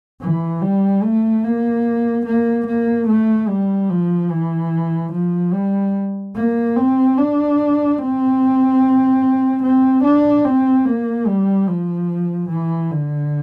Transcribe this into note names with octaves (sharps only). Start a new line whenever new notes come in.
E3
G3
A3
A#3
A#3
A#3
A3
G3
F3
E3
F3
G3
A#3
C4
D4
C4
C4
D4
C4
A#3
G3
F3
E3
D3